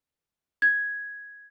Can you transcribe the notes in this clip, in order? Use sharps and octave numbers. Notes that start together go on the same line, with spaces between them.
G#6